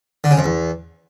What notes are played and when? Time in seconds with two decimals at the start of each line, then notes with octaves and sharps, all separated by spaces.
0.24 D3
0.31 C#3
0.38 F2
0.44 E2